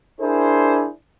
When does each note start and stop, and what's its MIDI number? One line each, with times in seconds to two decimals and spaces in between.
0.20 0.86 62
0.20 0.86 64
0.20 0.86 68
0.20 0.86 70
0.20 0.86 72